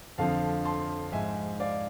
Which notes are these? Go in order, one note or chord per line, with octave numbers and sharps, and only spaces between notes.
F2 D3 F3 F5 A5
A5 C6
G#2 F3 E5 G#5
D5 F5